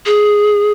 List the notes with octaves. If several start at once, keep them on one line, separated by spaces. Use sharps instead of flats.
G#4